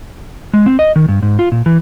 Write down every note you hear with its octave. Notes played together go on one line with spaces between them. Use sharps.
G#3
C4
D#5
D#3
G2
G#2
F4
A#2
E3